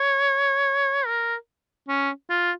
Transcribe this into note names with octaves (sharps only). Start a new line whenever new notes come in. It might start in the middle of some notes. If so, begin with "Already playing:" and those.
Already playing: C#5
A#4
C#4
F4